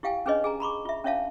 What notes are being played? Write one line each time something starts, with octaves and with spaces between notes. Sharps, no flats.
E4 G4 F5 G5 G#5
C#4 D4 G#4 B4 C#5 D#5
G#4 G#5 A#5
A#5 B5 C#6 D6
F4 E5
C#4 D4 C#5 E5 F5 A5